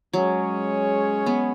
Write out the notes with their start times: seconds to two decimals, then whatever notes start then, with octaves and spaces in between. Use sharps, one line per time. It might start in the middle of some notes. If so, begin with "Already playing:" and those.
0.13 F#3 G#3 C#4 G#4 C#5
1.26 B3